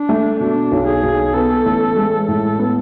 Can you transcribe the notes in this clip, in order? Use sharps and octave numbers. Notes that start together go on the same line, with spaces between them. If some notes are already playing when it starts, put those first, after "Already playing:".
Already playing: D4
A3
B2 D4
B1
G#4
B1
B3 A4
A1
G#3
A2 A4
B3